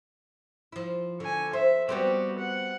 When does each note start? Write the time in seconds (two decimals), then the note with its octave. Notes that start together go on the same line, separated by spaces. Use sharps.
0.72 F3 E4
1.20 D3 G#5 C#6
1.53 C5 E5
1.89 G3 B3 C4 F#4 G4
2.38 F#5